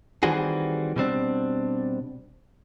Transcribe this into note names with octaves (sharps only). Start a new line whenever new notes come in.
D#3 E3 G3 C4 F#4 G#4
B2 G3 C4 D4